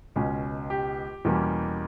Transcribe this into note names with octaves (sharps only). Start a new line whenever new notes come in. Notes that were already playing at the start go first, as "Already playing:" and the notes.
C#2 B2 G#3 C#4
G4
E2 B2 G3 A#3 C#4